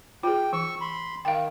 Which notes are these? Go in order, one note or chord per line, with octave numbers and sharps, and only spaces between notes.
F4 G#4 G5
E3 C#6 E6
B5 C6
D#3 F5 G5